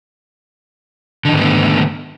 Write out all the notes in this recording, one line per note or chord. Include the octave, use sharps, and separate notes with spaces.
G#2 D3 D#3 A3 B3